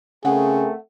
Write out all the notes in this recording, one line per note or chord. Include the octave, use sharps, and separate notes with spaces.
C#3 A3 C4 G#4 A#4 F#5